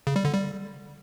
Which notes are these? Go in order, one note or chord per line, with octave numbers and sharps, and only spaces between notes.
C#3
G3
D3
G3